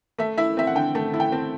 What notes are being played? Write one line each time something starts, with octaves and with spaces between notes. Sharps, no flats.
A3 E5
E4 E5
C4 E5
F#5
D3 G5
A3 A5
E4
G5
C4